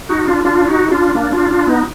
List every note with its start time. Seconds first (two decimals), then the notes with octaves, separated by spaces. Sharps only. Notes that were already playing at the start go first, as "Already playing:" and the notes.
0.09 D#4 F#4
0.27 D4 F4
0.45 D4 F4
0.68 D#4 F#4
0.91 D4 F4
1.15 A#3 D4
1.32 D4 F4
1.50 D4 F4
1.67 B3 D#4